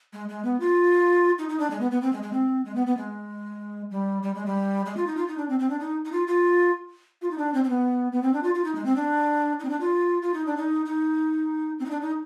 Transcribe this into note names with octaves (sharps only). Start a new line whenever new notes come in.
G#3
G#3
B3
F4
D#4
D#4
D4
G#3
B3
B3
C4
G#3
G#3
C4
G#3
B3
B3
G#3
G3
G3
G#3
G3
G#3
F4
D#4
F4
D#4
D4
C4
C4
D4
D#4
D#4
F4
F4
F4
D#4
D4
C4
C4
B3
B3
C4
D4
F4
F4
D#4
G#3
C4
D4
D#4
C4
D4
F4
F4
D#4
D4
D#4
D#4
C4
D#4
D4
D#4